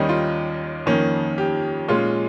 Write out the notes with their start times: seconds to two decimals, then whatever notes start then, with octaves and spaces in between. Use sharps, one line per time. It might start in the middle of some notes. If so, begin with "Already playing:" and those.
Already playing: D#2 D#3 G3 C#4 D#4
0.09 F4
0.86 F2 D#3 A#3 C#4
1.38 G4
1.88 A#2 G#3 C#4 F4